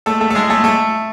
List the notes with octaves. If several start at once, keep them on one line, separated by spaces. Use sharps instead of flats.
A3 A4
A3 A4
A4
G#3 G#4
A3 A4
A3 A4